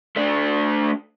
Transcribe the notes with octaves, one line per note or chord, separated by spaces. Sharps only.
A3 D4